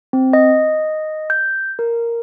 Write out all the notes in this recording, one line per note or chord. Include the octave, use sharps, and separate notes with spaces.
C4
D#5
G6
A#4